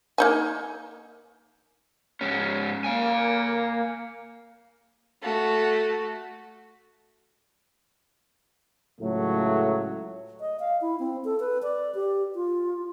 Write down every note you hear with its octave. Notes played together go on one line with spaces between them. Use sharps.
A#3 D#4 G#5
G#2 C#4
A#3 F5 G#5
A3 F#4
C#2 A2 F#3 A3
D#5
F5
E4
C4
A4
B4
D5
G4
F4